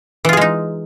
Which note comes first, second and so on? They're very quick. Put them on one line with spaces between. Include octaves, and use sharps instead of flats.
E3 F4 G#4 G#3 D#4